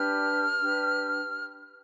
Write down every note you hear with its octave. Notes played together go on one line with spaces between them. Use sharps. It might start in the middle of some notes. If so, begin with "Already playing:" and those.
Already playing: D4 G4 B4 F6
D4 G4 B4